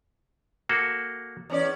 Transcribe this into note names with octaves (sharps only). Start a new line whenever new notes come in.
A#3 F#4 A4
E2 C#4 D5